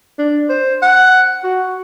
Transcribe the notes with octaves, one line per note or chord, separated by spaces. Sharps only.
D4
C5
F#5
F#4